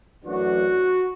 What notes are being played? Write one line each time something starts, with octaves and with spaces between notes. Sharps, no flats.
F#2 E3 A3 D4 F#4